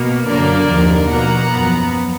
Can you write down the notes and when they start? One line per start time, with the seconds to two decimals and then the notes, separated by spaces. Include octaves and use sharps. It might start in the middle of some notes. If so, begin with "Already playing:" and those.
Already playing: B2 A#3
0.27 F#2 D3 F#3 A#3 A#4 D5
0.68 D#2 D3 F3
1.10 B2 A#3 F#5 A#5
1.51 F#2 F3 B3